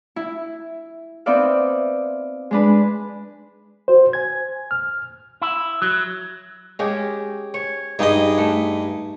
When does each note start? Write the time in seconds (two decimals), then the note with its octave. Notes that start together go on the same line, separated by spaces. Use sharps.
0.16 E4
1.26 B3 C4 D#4 D5 E5 F5
2.51 G#3 D4 B4
3.88 F#4 C5
4.13 G#5 G#6
4.71 F6
5.42 E4
5.82 F#3
6.79 G#3 C#4 G4
7.54 C#5
7.99 G2 D#4 E4 G#4 D#5
8.38 A3